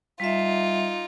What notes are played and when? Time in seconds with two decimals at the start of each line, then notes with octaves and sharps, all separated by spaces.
0.20 G3 D#4 F4 E5